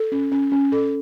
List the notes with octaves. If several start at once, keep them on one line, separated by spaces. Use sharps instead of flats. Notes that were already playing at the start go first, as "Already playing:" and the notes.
Already playing: A4
C#4
C#4
C#4
A4